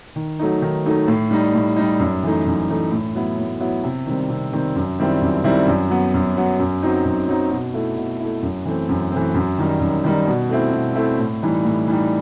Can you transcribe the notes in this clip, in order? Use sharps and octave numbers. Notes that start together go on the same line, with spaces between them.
D#3
F#3 A3 D#4
D#3
F#3 A3 D#4
A2
G3 D#4
A2
G3 D#4
F#2
E3 A3 D#4
F#2
E3 A3 D#4
A2
F#3 B3 E4
A2
F#3 B3 E4
C3
D#3 G3 C4
C3
D#3 G3 C4
F#2
D#3 G3 C4 E4
F#2
D#3 G3 C4 E4
F#2
F#3 B3
F#2
F#3 B3
F#2
F#3 C4 D#4
F#2
F#3 C4 D#4
B2
A3 E4
B2
A3 E4
F#2
E3 A3 C4
F#2
E3 A3 C4
F#2
D#3 G3 D#4
F#2
D#3 G3 D#4
B2
A3 C4 E4
B2
A3 C4 E4
A2
E3 G3 D#4
A2
E3 G3 D#4